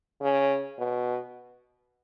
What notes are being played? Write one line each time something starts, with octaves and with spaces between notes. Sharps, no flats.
C#3
B2